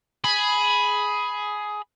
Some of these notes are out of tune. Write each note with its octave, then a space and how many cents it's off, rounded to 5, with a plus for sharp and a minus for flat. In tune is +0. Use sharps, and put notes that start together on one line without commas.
G#4 +10 B5 +0